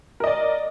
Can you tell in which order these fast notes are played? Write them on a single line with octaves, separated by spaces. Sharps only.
A#4 D#5 D5